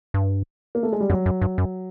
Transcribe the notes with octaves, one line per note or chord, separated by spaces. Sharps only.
G2
A#3
A3
G#3
G3
F#2 F#3
F#2
G2
F#2